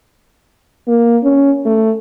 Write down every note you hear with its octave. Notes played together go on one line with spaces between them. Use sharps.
A#3
C#4
A3